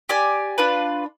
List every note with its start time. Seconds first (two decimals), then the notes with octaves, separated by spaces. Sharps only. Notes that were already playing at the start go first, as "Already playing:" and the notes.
0.09 G4 D5 G#5
0.58 D4 F4 B4